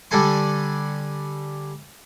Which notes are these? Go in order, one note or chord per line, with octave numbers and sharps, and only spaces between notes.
D3 G3 D4 A4 G#5 C6